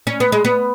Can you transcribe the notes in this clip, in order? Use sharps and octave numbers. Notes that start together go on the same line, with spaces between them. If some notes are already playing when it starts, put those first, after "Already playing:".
C#4
B3
G#3
B3